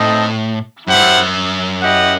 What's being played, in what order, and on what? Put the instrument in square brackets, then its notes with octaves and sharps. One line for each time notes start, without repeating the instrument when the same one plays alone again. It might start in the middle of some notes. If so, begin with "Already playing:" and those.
Already playing: [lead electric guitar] A2 [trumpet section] C4 D#4 A4 D#5
[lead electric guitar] F#2 [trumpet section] E4 G4 C5 F#5
[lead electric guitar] G2
F#2
[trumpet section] E4 G4 D#5 F#5